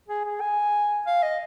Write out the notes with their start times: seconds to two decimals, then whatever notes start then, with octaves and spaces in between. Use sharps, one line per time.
0.08 G#4
0.25 G#4
0.41 G#5
1.07 F5
1.23 D#5